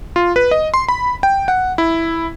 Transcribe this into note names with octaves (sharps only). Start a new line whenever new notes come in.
F4
B4
D#5
C6
B5
G5
F#5
E4